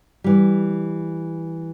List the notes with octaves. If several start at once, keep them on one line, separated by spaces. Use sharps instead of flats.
E3 G3